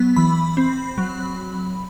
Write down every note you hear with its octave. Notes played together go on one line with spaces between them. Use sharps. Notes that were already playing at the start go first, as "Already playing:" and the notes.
Already playing: F#3 B3
E3 B5
C4
F#3